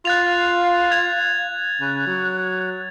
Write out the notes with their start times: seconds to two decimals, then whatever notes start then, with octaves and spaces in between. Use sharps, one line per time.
0.05 F4 F5 F#6 A6 F7
0.91 G#6 F7
1.80 C#3 F#6
2.06 F#3